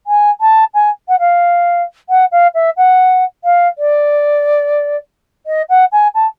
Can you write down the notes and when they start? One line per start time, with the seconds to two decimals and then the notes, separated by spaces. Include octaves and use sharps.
0.06 G#5
0.40 A5
0.74 G#5
1.08 F#5
1.19 F5
2.09 F#5
2.31 F5
2.54 E5
2.76 F#5
3.44 F5
3.78 D5
5.46 D#5
5.69 F#5
5.92 G#5
6.14 A5